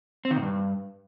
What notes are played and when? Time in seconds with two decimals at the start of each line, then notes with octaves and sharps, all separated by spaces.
0.25 C4
0.31 D#3
0.36 A#2
0.42 G2